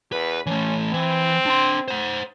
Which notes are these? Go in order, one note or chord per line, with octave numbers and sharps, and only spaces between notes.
E2 B4
E3 A3 C#4
E3 C4
D4 C6
C5 F#5